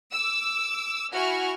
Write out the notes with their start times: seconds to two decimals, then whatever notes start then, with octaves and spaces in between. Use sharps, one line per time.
0.11 D6 E6
1.13 E4 F#4 G#5 C#6 F6